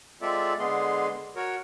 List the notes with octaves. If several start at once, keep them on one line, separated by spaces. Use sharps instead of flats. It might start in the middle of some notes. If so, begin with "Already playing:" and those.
G#3 C4 F4 A4 D5 E5
D3 G#3 B3 G#4 C6
F#4 A#4 C#5